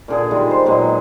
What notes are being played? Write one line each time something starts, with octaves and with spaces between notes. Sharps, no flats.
A#2 D3 G#4
D#3 G3 G#3 F4
C5
A#2 F#3 G#3 B3